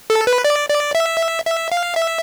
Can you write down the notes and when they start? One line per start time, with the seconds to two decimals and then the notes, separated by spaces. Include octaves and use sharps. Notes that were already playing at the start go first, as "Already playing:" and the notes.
0.10 A4
0.27 B4
0.44 D5
0.69 D5
0.95 E5
1.46 E5
1.72 F5
1.96 E5